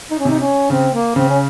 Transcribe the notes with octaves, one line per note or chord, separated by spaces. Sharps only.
D#4
C#4
C3 D#4
C#4
C#3 C4
A#3
C#3 C4
C#4